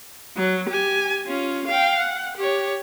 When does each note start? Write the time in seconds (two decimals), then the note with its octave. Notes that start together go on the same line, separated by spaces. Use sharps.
0.37 F#3
0.69 G4 G#5
1.26 C#4 F4
1.67 F5 G5
1.98 F#5
2.37 G4 C#5